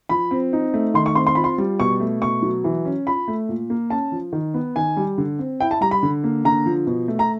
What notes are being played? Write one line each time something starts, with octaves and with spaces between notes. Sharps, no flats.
F3 B5
C4
D#4
A3
D#3 C6
C#6
C4 C6
C6
F4 B5
C6
G3
B2 C#6
A3
B2 C#6
F#3
E3
C#4
F4 B5
A3
A#2
A#3
C#4 A5
F3
D#3
B3
D#3 G#5
G3
D3
C4
E4 G5
A5
G3 A#5
B5
D3
A#3
D3 A#5
F3
B2
A3
A#5